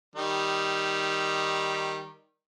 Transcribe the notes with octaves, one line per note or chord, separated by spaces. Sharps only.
D#3 G3 D#4